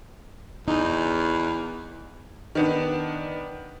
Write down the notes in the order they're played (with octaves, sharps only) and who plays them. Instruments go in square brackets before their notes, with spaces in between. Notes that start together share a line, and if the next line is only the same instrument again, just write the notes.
[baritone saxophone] E2 [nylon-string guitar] D#4
[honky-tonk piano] D#3 B3 D4